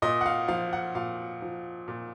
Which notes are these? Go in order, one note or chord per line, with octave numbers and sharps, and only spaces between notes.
A#2 D#5
F#5
F5
F3 F5
F#5
A#2 F5
F3
A#2